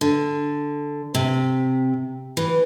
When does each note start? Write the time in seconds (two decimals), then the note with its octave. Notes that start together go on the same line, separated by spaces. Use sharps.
0.01 D3
1.15 C3
2.37 E3